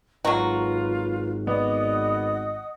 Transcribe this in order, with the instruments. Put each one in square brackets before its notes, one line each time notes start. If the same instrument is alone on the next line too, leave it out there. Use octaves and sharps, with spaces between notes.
[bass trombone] G#1 [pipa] F#3 F#4 [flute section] F4 B4 [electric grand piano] A#5
[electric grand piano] B3 D5 [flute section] D#5 F#5 D#6